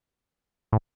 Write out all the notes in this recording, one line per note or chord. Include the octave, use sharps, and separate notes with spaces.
A2